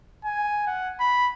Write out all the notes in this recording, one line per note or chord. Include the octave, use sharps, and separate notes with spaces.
G#5
F#5
B5